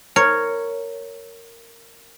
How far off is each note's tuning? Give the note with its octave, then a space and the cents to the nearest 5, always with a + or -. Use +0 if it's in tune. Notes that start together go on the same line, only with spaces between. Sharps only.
A#4 -10 C#5 +0